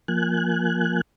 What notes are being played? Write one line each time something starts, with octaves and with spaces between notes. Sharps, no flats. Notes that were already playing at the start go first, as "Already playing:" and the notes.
F3 A#3 G#5 F#6